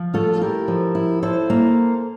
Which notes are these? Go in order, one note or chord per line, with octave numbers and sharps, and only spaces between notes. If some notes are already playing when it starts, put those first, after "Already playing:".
Already playing: F3
A3 F4 A4
A4
E4 G4 A#4
F3
E4
E4 A4 C5
A#3